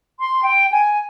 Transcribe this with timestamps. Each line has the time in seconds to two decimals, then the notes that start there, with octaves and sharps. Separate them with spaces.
0.21 C6
0.44 G5
0.72 G#5